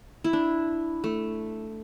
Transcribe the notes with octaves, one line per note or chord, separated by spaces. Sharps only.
E4
D4
A3